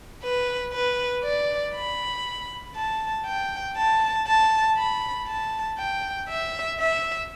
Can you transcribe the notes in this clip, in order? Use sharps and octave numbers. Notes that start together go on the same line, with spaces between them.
B4
B4
D5
B5
A5
G5
A5
A5
B5
A5
G5
E5
E5